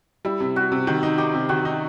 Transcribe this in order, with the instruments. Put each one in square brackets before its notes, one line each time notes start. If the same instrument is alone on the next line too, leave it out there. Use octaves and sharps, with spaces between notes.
[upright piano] G3 [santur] E4
[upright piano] C3
[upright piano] G3 [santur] F#4
[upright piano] C3
[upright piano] D#3 [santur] F#4
[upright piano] D#4
[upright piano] D#4 [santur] G4
[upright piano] C3
[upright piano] D#3 [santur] F#4
[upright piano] D#4